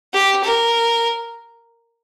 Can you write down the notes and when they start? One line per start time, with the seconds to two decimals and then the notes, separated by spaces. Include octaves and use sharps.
0.14 G4
0.44 A#4